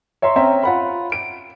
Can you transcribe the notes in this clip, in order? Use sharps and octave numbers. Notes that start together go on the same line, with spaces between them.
C#5 E5 A#5 C6
C4 C#4 E5 G5 A#5
F4 F#5 B5
D7